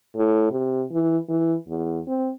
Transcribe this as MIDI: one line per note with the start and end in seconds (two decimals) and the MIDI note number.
0.17 0.48 45
0.51 0.84 48
0.92 1.17 52
1.29 1.55 52
1.68 2.01 40
2.08 2.30 60